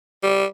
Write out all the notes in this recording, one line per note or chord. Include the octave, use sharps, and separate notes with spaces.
G3